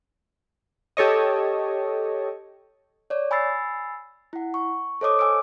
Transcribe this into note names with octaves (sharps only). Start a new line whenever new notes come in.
G4 A4 C#5 D#5
C#5 D5
G#5 B5 E6 A6 C7
E4 F#5
C#6
A4 C5 C#5 D#5 D6 D#6
G#5 D6 E6 D7